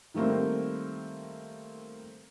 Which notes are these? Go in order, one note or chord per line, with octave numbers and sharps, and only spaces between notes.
D#3 G3 A3 A#3 C4